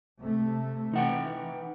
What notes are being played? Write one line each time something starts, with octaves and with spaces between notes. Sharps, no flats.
C3 A3
E3 D#4 F#5 G5